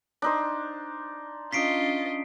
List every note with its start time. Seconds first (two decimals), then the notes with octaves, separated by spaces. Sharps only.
0.22 D4 D#4 C5
1.53 C#4 D4 F4 D#5 D#6 B6 C7 D7